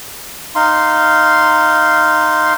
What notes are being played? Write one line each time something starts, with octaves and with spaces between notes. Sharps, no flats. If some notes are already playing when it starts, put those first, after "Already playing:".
D#4 F5 C6